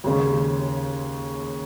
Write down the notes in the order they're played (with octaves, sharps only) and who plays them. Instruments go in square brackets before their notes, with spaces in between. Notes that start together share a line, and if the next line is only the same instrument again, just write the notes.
[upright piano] D#2 C#3 G#3 C#4